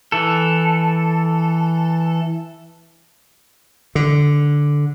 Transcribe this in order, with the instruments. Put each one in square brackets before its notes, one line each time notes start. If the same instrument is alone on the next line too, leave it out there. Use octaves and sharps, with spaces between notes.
[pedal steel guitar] E3 A4
[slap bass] D3